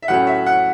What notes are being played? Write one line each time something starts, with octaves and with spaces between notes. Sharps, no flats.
E5
A2 F#3 A3 C#4 F#5
E5
F#5